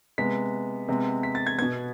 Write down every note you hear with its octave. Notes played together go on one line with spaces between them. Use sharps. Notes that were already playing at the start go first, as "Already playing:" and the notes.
C3 G#3 B3 B6
C3 G#3 B3
B6
A6
G#6
B2 B3 G#6